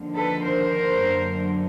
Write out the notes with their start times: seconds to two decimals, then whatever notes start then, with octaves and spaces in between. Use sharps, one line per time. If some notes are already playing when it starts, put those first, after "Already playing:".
Already playing: D#2 D3 F3 A#3
0.16 A4 B4
0.44 A#4 C5
1.01 F#2 D3 F#3 A#3